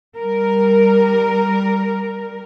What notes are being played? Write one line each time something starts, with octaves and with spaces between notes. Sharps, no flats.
G3 A#4